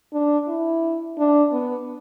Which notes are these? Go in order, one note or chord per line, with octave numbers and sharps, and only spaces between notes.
D4
E4
D4
B3